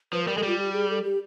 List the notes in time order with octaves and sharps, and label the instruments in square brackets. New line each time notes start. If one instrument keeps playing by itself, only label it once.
[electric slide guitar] F3 [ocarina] B4
[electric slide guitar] G3 [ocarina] A#4
[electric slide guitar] G#3 [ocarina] A4
[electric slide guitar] G3 [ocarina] F4
[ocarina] G4
G#4
A4
G4